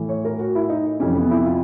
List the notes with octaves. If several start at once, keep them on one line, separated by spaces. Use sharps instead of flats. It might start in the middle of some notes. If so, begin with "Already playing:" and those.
Already playing: A2 E3
C#5
A#4
F#4
E4
D#4
F2 C3 E3 C#4
B3
E4
F4